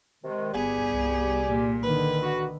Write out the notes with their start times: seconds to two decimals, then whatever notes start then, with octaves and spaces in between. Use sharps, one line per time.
0.24 C3 D#3 G#3
0.53 G1 G3 B3 G4 G#4 G#5
0.90 C2
1.47 A#2
1.82 D3 D#3 B4
2.22 F#4